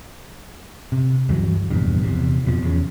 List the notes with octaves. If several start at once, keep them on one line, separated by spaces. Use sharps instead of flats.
C3
D2 G2 E3 F#3
F1 A#1 E2 G2
E2 C3
F2 B2 F3
E2 C#3